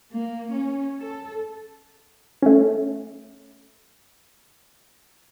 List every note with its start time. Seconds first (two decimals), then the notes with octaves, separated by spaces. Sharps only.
0.13 A#3
0.53 C#4
1.00 A4
2.42 A3 C#4